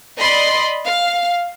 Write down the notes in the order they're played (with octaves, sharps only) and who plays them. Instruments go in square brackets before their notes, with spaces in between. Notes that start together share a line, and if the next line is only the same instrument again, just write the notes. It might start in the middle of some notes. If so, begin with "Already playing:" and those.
[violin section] D5 D#5 B5 C6
F5